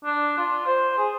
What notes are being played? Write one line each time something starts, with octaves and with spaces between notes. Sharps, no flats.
D4
F4
C5
G#4